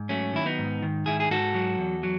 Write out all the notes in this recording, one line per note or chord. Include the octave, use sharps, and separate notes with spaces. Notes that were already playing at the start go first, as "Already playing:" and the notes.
Already playing: G#2
F#3 A3 C#4
D#3 E4
B3 D#4
G#2
D#3
G#2 E4 G#4
G#4
G#2 F#4 A4
F#3
E2
F#3